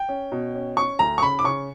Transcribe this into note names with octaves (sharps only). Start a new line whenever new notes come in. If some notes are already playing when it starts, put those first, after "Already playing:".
Already playing: G5
C#4
B2
C#4
C#4 C#6
D2 A#5
C#6
C#3 B5
D6
C#3 C#6